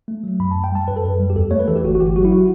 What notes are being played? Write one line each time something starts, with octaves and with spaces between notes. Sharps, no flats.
A3
F#3
F#2 B5
F#2 A5
G5
G3 A5
F#2 B4
A4
F#2 B4
G3
G4
E2 A4
A3 C#5
B4
E3 A4
G4
G1 F#4
F#4
G1 G4
F#3 F#4
E4
F#4